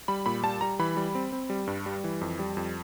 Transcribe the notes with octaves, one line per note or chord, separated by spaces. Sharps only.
G3 B5
A#2 B5
G3 A5
G3 A#5
E3 B5
G3
C4
C4
G3
G2
G3
E3
F2
G3
F2